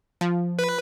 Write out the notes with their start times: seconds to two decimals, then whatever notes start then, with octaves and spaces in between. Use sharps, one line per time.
0.21 F3
0.59 B4